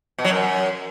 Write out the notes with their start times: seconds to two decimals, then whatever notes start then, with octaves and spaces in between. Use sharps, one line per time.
0.18 B2
0.25 F#3
0.31 F#2